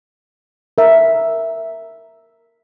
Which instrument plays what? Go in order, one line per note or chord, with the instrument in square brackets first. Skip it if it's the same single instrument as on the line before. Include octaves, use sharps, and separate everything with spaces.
[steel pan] A#4 E5